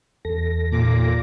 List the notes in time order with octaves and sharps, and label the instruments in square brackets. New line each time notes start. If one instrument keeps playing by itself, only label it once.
[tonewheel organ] E2 A4 A#6
[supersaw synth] A#2 D6